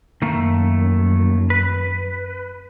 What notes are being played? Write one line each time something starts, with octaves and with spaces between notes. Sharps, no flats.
F#2 D#3 A3 A#3
B4